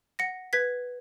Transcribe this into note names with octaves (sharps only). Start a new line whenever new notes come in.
F#5 A#6 C#7
B4 G#6 B6